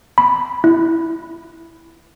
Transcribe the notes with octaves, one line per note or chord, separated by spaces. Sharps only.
B5
E4